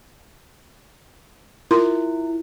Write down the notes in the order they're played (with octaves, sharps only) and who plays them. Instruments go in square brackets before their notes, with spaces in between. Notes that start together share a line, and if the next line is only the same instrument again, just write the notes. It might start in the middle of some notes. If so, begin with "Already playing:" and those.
[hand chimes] E4 [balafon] F4 A#4 C6